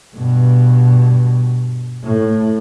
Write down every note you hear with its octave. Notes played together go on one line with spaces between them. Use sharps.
G2 B2
A2